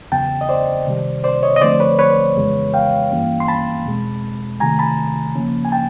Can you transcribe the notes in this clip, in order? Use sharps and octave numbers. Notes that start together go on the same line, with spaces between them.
E2 C#3 F#3 B3 G5 A5
D#5
C5 D5
C3 D#3 G3
C5 D5
C#5 D#5
D#5
D3 F3 A3 C4 C5 D5
B4 C#5
B4 C#5
F2 C#3 E3 G#3 B3
F5 G5
G2 E3 G3 A#3 C#4
C6
A5 B5
E2 B2 G#3 C4
C3 D#3 F#3 A3 G#5 A#5
A5 B5
C#3 F3 A#3 C#4
G#5
G5 A5